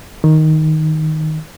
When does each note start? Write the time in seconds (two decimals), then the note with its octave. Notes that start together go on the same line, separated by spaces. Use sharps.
0.24 D#3